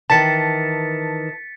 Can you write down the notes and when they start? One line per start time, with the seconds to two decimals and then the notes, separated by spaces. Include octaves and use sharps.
0.10 D#3 E3 A5 A6 B6 C#7